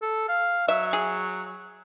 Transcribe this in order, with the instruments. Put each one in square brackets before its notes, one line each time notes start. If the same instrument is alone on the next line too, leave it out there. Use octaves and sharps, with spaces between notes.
[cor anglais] A4
F5
[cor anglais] F#3 [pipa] E5
[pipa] G#4